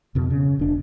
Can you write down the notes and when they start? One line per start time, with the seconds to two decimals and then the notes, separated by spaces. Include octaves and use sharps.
0.15 F2 B2
0.30 C#3
0.59 E1 D4